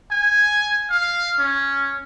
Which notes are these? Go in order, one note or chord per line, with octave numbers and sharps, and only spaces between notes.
G#5
F5
C#4